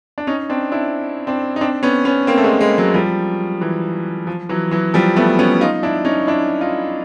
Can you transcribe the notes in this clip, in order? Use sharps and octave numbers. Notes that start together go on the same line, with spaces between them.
D4
C#4 D#4
C4 D4
D4 E4
C4 D4
D#4
C4 D4
B3 C#4
B3 C#4
A#3 C4
A3
G#3 A#3
G#3 A#3
F#3 G#3
F3 G3
E3 F#3
F3
E3 F#3
E3 F#3
F3 G3
A3 B3
B3 C#4
D#4 F4
D4 E4
C#4 D#4
D4 E4
D#4 F4